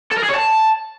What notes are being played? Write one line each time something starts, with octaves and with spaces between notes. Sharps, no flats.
A4
A#4
G#4
C#5
A5